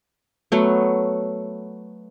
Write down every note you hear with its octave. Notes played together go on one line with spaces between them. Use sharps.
F#3 A3 B3